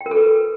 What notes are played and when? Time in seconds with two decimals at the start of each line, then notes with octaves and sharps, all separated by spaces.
0.01 G5
0.06 A#4
0.11 A4
0.17 B4